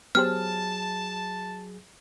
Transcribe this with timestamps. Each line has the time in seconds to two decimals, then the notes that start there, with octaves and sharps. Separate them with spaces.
0.15 F#3 B3 G4 G#4 C5 A5 F6